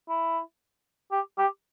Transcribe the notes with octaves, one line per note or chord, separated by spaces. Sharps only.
E4
G4
G4